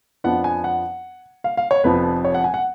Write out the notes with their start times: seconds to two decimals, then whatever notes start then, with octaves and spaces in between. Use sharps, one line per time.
0.24 F2 F3 B3 D4 F#5
0.44 G#5
0.64 F#5
1.44 F5
1.57 F5
1.71 C#5
1.84 F1 F2 F3 B3 B4
2.25 C#5
2.34 F#5
2.44 G#5
2.54 F#5